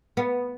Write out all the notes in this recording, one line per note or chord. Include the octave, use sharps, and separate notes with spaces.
B3